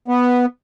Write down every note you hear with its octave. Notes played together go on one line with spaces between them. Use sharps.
B3